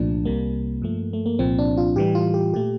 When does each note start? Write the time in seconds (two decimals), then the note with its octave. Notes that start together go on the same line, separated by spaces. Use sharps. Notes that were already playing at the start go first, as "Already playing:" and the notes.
Already playing: C2 A#2 F3 A3 D4
0.25 C2 C3 G3 A#3
0.82 G2 F3 A3
1.13 A3
1.26 A#3
1.39 C2 A#2 F3 C4
1.58 D4
1.77 F4
1.96 A2 E3 G3 G4
2.15 F4
2.34 G4
2.54 A#2 A3 G4